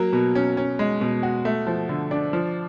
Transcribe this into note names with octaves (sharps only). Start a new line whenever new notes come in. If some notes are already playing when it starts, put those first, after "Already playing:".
Already playing: F#3 A#3
B2
C#4
C#4
G#3
B2
F#4
A3
F3
D3
D4
F3